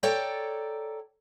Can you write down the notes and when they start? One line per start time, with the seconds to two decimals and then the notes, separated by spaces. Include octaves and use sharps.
0.03 A4 C#5 D5 G5 A#5